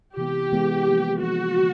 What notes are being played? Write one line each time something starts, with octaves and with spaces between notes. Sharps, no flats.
C3 E3 G#3 B3 G4
C3 E3 G#3 B3
F3 A#3 D#4
F3 A#3 D#4 F#4
D3 F3